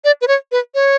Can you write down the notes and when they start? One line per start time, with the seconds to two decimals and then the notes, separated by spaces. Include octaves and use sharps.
0.05 D5
0.21 B4
0.28 C#5
0.52 B4
0.75 C#5